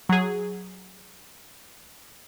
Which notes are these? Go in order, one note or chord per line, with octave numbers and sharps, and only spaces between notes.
F#3 G#4